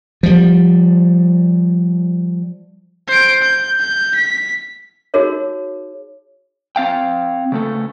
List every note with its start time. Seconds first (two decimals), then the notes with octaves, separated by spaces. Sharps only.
0.23 F3 G3
3.08 C5 D7
3.42 G6
3.80 G6
4.15 B6
5.14 D#4 F#4 G#4 A#4 C#5
6.76 C4 F5 G5
7.52 C#3 A3 A4